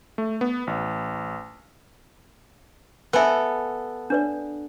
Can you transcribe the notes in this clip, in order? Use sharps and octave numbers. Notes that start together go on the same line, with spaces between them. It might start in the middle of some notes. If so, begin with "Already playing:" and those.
A3
B3
A1
B3 A4 E5 G#5 E6
D4 B4 D5